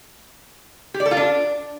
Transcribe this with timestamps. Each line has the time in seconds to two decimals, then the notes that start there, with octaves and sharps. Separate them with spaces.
0.94 G4
1.00 D5
1.06 A4
1.11 F4
1.17 D4